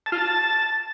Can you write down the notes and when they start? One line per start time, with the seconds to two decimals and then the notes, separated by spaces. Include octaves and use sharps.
0.06 A5
0.12 F4
0.18 A5